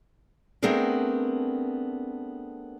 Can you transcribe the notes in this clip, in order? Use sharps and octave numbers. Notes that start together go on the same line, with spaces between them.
A3 B3 C4 D4 G#4 A#4